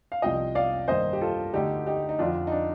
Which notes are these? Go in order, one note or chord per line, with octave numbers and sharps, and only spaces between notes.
F5
C2 C3 F3 D#5 G5
D5 F5
G2 D#3 A#3 C5 D#5
G4
F4 A4
D2 D3 A3 D#4 G4
D#4 G4
D#4
F2 D3 F3 D4 F4
D#4
D4